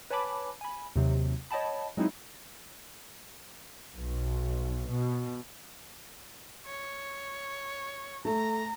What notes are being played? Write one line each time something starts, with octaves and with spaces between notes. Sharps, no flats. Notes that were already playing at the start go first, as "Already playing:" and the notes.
B4 C#5 G#5 A5 B5 D6
G#5 B5
D#2 C3 F#3
C#5 D#5 G5 A5 B5
F#3 G#3 C4 D#4 E4
B1
B2
C#5
A3 A#5